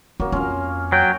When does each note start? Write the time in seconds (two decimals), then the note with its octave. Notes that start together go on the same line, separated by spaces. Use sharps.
0.20 F#3 A#3 C#4
0.32 F2 C#4 F4 F5
0.92 F#3 C#5 G5